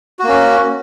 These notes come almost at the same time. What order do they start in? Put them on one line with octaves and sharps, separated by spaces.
F#4 A#3 C#4